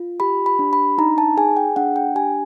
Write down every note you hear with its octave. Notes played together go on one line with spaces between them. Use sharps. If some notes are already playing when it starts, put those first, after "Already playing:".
Already playing: F4
G4 B5
B5
D4
B5
D#4 A#5
A5
G#4 G#5
G5
D4 F#5
G5
G4 G#5